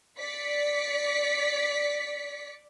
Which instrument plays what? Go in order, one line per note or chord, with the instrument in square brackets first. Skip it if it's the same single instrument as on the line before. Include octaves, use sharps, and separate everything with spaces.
[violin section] D5 B6 C#7